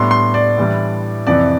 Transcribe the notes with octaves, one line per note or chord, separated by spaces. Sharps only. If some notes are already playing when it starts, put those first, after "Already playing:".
Already playing: A2 G3 B3 D4 C6
C6
D5
A2 E3 G3 D4
F2 C3 E3 D5